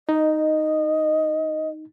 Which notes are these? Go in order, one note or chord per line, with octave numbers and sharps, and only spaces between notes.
D#4 D#5